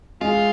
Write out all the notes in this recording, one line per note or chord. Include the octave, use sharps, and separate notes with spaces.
G#3 F4